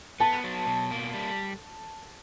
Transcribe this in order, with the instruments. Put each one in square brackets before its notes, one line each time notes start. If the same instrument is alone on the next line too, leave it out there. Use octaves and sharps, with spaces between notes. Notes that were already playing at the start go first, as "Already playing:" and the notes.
[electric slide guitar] B3 [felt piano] A5
[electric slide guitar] F#3
B2
A#3
G3